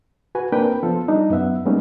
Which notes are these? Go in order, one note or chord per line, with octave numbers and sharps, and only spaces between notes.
F#4 B4 G#5
A#3 C4 D4 A#4 B4 G5
F3 B3 F4 A4
G3 D4 D#4
F#2 B3 E5 F#5
G3 G#3 A#3 B3 C#4 D#4